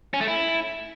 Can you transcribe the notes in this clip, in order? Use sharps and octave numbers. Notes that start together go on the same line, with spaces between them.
C#4
A3
E4